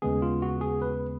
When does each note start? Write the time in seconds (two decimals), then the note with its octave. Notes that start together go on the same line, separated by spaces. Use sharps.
0.02 D#2 C#3 G#3 B3 G#4
0.22 F4
0.42 F#4
0.61 G#4
0.82 B4